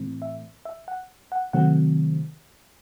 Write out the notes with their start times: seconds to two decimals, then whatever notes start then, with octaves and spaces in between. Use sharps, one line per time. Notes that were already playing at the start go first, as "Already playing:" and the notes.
Already playing: A2 E3 A3 C4
0.22 E5
0.65 E5
0.88 F#5
1.32 F#5
1.53 C3 D#3 F#3 A3 C4 F#5